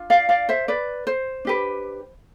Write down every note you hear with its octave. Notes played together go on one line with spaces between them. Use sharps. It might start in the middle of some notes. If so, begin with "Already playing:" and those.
Already playing: D4 F4
D5 F5
D5 F5
C5 E5
B4 D5
C5
D4 G4 B4